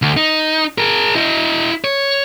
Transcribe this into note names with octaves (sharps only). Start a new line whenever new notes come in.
D2
D#4
G#4 A#4
E4 D#5
C#5